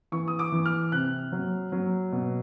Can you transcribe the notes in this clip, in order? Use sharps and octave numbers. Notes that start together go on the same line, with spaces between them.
E3 C#6
D#6
D6
E3
F6
C3 F#6
F#3
F#3
B2